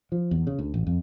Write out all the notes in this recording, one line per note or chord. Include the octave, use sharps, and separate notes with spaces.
F3
E2
C#3
D2
A1
F2